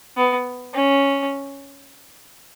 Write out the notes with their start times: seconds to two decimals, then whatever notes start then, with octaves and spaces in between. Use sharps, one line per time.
0.17 B3
0.73 C#4